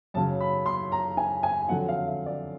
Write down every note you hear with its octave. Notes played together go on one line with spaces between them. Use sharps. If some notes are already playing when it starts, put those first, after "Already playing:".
F#2 C#3 F#3 A5
B5
C6
A#5
G#5
G#5
F2 D3 F#3 F#5
F5
E5
D5